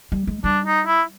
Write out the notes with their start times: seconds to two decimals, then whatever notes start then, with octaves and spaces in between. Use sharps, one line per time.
0.12 G3
0.27 G#3
0.44 G3 D4
0.66 D#4
0.87 E4